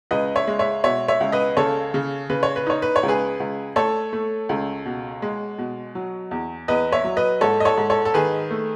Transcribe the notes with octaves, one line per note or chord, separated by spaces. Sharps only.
C#2 B4 D#5
C#5 E5
G#3
C#5 E5
B2 C#5 E5
C#5 E5
C#2
B4 D#5
C#3 A4 C#5
C#3
C#3 B4
C#5
B4
D#4 C#5
B4
C#5
C#2
G#4 B4
C#2
A3 A4 C#5
A3
C#2
B2
G#3
B2
F#3
E2
E2 B4 D#5
C#5 E5
F#3
B4 D#5
G#2 A4 C#5
D#5
A4 C#5
G#2
A4 C#5
A4
D#3 G#4 B4
A3